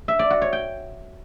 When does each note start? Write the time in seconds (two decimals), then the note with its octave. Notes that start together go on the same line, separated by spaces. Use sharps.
0.08 E5
0.19 D5
0.30 F#4
0.41 C#5
0.53 G5